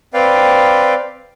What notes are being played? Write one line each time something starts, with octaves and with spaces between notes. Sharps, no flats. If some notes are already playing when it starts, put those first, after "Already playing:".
C4 B4 D5 F5 G5